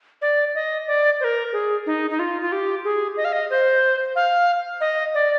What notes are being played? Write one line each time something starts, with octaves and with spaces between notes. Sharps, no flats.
D5
D#5
D5
C5
A#4
G#4
D#4
D#4
F4
F4
G4
G#4
D#5
F5
D#5
C5
F5
D#5
D5